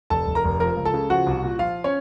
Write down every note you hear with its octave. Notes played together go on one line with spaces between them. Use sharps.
F1 A4 A5
F1
A#4 A#5
F1
F3 A#4 A#5
C#2
A4 A5
C#3
F3 F#4 F#5
C2
A#2
F3 F4 F5
C#4 C#5